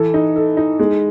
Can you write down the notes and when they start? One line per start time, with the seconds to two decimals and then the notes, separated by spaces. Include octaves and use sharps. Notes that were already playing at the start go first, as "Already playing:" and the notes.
Already playing: E3 A4
0.14 D#4
0.36 A4
0.57 D#4
0.79 G#3